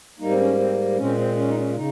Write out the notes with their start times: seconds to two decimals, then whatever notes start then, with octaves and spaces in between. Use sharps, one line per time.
0.19 G#2 G3 A#3 D#4
0.30 C4
0.38 C#4
0.58 C4
0.97 A#2 G#3 C4 C#4
1.17 C4
1.36 C#4
1.48 D#4
1.56 C#4
1.69 F4
1.76 C#3 D#4